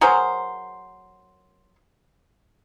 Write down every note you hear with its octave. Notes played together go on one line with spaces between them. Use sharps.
F#3 G#4 A#4 C5